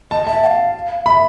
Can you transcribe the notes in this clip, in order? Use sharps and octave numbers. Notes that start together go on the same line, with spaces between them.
D#5 A5
E5 A5
G5
F5
E5 B5